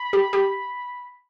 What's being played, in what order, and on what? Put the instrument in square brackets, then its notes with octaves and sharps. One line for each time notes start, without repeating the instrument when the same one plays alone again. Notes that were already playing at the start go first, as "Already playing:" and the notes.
Already playing: [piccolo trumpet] B5
[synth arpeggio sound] G4
G4